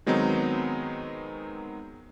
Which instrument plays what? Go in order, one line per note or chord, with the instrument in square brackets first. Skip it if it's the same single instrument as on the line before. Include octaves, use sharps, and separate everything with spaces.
[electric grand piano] D#3 F#3 G#3 B3 C4 D#4